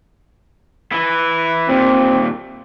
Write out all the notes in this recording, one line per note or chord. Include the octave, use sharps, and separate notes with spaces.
E3 E4
D#2 A#2 C4